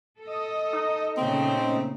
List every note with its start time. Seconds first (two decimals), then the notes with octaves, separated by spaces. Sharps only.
0.21 A4 D#5
0.73 D#4
1.18 A#2 C#3 A3 C4